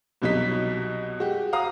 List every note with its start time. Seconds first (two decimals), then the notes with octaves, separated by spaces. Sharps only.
0.22 C2 B2 F#3 D#4 B6
1.19 G#3 F#4 G4
1.53 F5 F#5 A#5 D#6